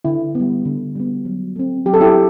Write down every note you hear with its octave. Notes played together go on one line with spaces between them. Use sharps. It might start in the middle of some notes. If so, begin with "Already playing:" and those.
D3 E4
G3 B3
D3
G3 B3
F#3
A3 C4
F#3 G4
A4
E4 G4